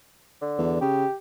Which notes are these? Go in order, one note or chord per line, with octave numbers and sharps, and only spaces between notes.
D3
E2
C#3 G4